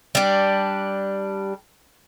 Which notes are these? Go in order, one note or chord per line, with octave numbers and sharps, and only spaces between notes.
G3 D4